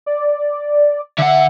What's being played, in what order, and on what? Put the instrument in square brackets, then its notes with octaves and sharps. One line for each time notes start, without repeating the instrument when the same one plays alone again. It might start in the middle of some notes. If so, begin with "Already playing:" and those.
[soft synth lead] D5
[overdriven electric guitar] D3 F#5 [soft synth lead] E5